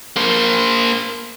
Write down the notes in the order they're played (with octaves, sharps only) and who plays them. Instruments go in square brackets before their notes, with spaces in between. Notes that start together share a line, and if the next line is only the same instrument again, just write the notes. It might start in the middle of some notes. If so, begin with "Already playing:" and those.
[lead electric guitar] A#3 C5